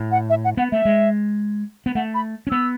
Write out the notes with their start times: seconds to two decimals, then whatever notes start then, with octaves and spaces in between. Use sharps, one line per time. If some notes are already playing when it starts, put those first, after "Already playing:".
Already playing: A2
0.11 F#5
0.30 E5
0.45 F#5
0.57 B3 F#5
0.72 A3 E5
0.85 G#3
1.86 B3
1.95 A3 F#5
2.14 B5
2.47 C#4
2.50 B3 E6